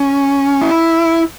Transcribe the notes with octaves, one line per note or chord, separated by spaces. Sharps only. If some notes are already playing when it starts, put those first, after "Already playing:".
Already playing: C#4
E4